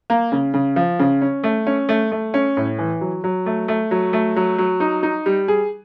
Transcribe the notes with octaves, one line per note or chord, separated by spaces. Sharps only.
A#3
C#3
C#3
F3
C#3
C#4
A3
C#4
A3
A3
C#4
A2
E3
F#3
F#3
A3
A3
F#3
A3
F#3
F#3
D#4
D#4
G3
G#4